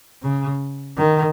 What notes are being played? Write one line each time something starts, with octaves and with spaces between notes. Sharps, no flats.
C#3
D#3